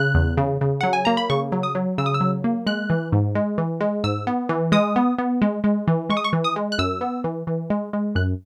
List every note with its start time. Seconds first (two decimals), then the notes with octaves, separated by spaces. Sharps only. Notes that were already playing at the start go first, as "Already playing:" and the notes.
Already playing: C#3 F#6
0.15 E2
0.37 C#3
0.61 C#3
0.81 F#3 F#5
0.93 G#5
1.05 A#3 A#5
1.17 B5
1.30 C#3 C#6
1.52 F#3
1.63 D#6
1.75 F#3
1.98 C#3 E6
2.06 D#6
2.14 E6
2.21 F#3
2.44 A#3
2.67 G#3 F#6
2.90 E3
3.12 G#2
3.35 G#3
3.58 E3
3.81 G#3
4.04 G#2 E6
4.27 B3
4.49 E3
4.72 G#3 D#6
4.96 B3
5.18 B3
5.42 G#3
5.64 G#3
5.87 E3
6.10 G#3 C#6
6.17 D#6
6.24 C#6
6.33 E3
6.44 D#6
6.56 G#3
6.72 F#6
6.78 F#2 E6
7.01 B3
7.24 E3
7.47 E3
7.70 G#3
7.93 G#3
8.15 F#2 F#6